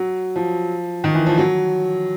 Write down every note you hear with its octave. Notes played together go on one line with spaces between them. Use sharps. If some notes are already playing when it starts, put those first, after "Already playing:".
Already playing: F#3
F3
D#3
E3
F3
F#3